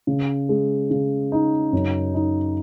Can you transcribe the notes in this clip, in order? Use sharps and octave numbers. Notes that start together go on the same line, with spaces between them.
C#3
G#3
C#3
D#4
F#2
D#4